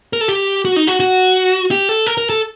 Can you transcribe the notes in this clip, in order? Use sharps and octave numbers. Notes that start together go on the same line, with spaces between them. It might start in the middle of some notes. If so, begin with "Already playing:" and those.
A#4
A4
G4
F#4
D#4
F#4
F#4
G4
A4
A#4
A#4
A4